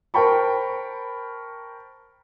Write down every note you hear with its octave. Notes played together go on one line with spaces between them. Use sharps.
A#4 C5 G5 A5 B5 C#6